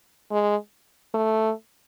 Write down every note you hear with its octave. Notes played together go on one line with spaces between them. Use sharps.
G#3
A3